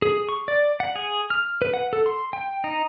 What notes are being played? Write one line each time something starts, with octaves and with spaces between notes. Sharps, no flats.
G#4
C#6
D5
F#5
G#4
F6
B4
F#5
A4
C6
G5
D#4